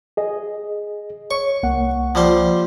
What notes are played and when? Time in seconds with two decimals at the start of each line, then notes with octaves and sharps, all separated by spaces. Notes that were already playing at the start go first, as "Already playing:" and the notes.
0.17 G#4 D#5
1.31 C#5 C#6
1.63 C2 A#3 F#5
2.15 F3 G3 C5